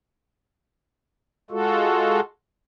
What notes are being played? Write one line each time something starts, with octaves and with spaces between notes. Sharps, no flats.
G#3 F4 F#4 A4